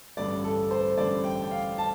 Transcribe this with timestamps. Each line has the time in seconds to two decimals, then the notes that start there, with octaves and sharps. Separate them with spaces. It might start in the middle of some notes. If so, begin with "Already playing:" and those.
0.17 A1 G2 D3 D5
0.44 A4
0.71 C5
0.97 A1 G2 D3 D5
1.24 G5
1.44 G5
1.51 F5
1.78 A5